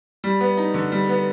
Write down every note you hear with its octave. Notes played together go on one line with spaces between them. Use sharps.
G3
B3
D#4
D3
G3
B3